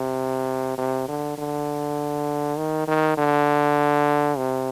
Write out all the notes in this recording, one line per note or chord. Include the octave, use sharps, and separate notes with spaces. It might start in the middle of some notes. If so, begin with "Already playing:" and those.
Already playing: C3
C3
D3
D3
D#3
D#3
D3
C3